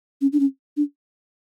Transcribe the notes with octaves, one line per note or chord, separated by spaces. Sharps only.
C#4
D4
C#4
D4